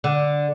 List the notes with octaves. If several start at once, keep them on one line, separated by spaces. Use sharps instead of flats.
D3